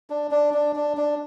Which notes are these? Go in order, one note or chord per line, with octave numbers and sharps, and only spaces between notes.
D4
D4
D4
D4
D4